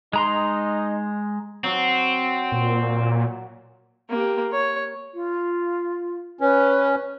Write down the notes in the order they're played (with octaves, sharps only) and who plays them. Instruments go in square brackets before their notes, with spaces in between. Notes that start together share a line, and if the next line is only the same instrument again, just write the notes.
[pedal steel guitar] G#3 A#5 C6 [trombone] D#4
[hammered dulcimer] F#3 [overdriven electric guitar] C4
[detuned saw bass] A#2
[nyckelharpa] A#3 G4
C#5
[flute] F4
[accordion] C#4 [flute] B4